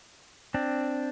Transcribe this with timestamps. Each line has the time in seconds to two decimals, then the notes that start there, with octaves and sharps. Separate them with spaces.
0.54 C4 D4